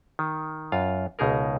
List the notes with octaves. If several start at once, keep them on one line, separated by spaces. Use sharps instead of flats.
D#3
F#2 F4 F5
C#2 B2 D#4 G#4 A#4